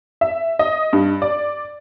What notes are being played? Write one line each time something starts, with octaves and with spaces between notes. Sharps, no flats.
E5
D#5
G2
D5